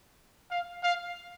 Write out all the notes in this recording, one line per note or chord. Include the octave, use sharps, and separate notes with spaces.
F5
F5